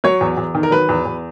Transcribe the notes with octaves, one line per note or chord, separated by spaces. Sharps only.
F#3 C#5
E2
E2
D#3
A#4
F#3 B4
E2
E2